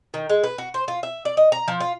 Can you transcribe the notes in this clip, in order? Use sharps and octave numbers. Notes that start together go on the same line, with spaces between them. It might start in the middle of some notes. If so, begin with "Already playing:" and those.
D#3
G#3
B4
F#4
C5
F4
E5
D5
D#5
A#5
F3
F4